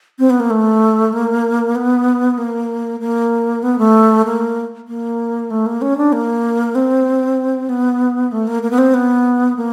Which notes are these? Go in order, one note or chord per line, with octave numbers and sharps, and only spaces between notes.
C4
B3
A#3
A3
A#3
B3
A#3
A#3
B3
A3
A#3
A#3
A3
A#3
C#4
D4
A#3
C4
B3
A3
A#3
A#3
B3
C4
B3
A#3